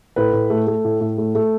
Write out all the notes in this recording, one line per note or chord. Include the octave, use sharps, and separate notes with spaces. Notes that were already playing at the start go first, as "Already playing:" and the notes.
A2 B4
A2
A3
A3
A2
A2
A3
A3